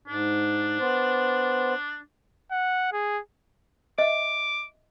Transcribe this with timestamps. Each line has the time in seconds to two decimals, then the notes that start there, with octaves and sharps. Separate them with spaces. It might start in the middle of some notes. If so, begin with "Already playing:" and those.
0.08 G#2 D4
0.80 B3 C5
2.51 F#5
2.92 G#4
3.98 D#5 E5 D6